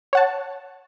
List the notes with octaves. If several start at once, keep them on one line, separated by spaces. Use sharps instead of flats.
C#5 F#5 A5